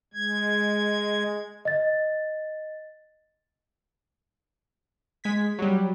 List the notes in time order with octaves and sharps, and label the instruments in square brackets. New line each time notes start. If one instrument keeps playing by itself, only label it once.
[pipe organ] G#3 G#6
[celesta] D#5 A6
[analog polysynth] G#3 G#6 B6
F#3 G3